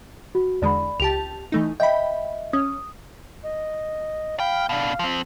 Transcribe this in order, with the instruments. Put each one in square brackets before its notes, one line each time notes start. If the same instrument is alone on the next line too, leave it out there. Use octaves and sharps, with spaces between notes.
[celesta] F#4
[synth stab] E2 D3 G#3 [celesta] D5 B5
[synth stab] C#2 G4 A5 [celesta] F7
[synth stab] E3 A3 D#4
[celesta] D#5 E5 [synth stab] G5 B5
[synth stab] C#4 [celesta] D#6
[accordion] D#5
[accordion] F5 B5 F6 [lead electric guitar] G5
[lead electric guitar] B2 D4 [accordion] F5
[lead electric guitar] F3 C4